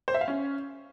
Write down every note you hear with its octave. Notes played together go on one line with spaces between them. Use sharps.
C5
E5
F5
C#4